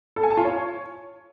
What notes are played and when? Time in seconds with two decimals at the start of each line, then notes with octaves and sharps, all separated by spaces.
0.16 A4
0.23 G#5
0.30 A5
0.37 F4
0.44 C#5